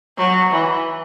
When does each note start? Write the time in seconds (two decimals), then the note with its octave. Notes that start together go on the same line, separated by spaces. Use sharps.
0.18 F#3
0.52 E3